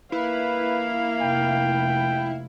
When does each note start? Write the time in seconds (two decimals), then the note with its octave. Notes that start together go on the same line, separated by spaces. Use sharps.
0.12 A#3 E4 B4 F5
1.21 F1 G5